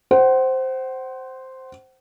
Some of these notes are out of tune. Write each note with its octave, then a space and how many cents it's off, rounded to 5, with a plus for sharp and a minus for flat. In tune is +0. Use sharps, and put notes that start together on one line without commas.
C5 +0 F#5 +35